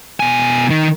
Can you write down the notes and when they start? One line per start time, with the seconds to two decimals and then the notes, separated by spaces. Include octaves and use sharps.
0.20 B2 G#5
0.70 D#3